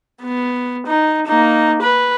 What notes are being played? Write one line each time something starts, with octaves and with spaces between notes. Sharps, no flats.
B3
D#4
A#3 D#4
B4